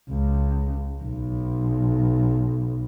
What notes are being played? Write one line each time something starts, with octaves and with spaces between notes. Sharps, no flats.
C#2
B1